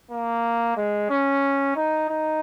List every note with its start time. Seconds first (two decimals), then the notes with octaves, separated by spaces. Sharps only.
0.11 A#3
0.77 G#3
1.10 C#4
1.76 D#4
2.09 D#4